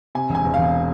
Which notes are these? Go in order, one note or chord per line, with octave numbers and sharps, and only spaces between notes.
C3 G#5
E1
G#5
E2
E1 F5